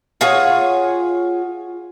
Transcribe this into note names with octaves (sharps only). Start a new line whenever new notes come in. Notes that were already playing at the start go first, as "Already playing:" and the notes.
F4 G#4 C#5 F#5